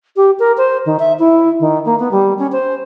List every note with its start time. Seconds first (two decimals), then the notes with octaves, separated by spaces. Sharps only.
0.16 G4
0.39 A#4
0.58 C5
0.86 D#3
0.99 E5
1.19 E4
1.60 D#3
1.85 A#3
1.99 B3
2.12 G3
2.39 C#4
2.52 C5